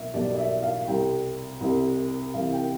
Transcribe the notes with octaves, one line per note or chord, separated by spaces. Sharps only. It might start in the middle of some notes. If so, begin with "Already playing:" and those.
Already playing: B1 B2 E5
B1 B2 G3 D5
D5
E5
F5
C2 C3 G3 G5
C2 C3 G3
C2 C3 E3 F5
G5